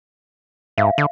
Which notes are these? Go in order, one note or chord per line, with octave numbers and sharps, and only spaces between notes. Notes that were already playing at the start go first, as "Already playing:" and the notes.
G#2 E5 F5
D3